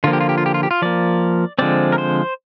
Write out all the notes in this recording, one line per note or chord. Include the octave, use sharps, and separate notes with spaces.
D3 F3 A#3 F4
G4
F4
G4
F4
G4
F4
G4
F4
F3 A#3 D5
D3 F3 G#3 C4 D5
A#4
C5